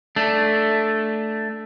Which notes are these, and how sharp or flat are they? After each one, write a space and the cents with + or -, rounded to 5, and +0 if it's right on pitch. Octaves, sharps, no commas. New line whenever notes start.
A3 +0 D4 +0